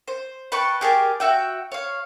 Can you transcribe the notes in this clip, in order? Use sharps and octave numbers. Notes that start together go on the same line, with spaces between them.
C5
B4 G5 A5 C#6
G4 G#4 A#4 A5
F#4 E5 G5
C#5 F5